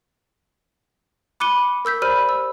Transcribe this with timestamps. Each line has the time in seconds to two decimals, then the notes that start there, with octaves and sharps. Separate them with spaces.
1.40 B5 D6 F#6 C#7 D#7 G7
1.85 A#4 E6 G6 B6
2.02 G4 C5 D5 B5 F6 D#7
2.29 E6